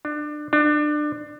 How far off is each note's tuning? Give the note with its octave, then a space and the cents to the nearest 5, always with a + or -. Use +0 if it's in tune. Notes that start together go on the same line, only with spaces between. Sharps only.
D4 +25
D4 +25